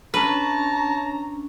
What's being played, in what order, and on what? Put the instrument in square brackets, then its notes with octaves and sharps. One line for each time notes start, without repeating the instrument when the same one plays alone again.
[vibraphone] C#4 D4 [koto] B4 [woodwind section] C#5 A5 A#5